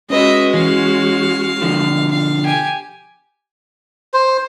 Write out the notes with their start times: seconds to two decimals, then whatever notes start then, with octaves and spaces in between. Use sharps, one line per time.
0.10 G#3 C#4 F#4 B4 D#5 E5
0.54 E3 C#4 F5
1.61 B2 D3 F3
2.11 F5
2.44 G4 G#5
4.14 C5